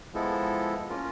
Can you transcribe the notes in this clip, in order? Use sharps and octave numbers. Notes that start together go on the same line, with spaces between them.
F3 G#3 B3 E4 A4
A#3 C#4 F4 A#4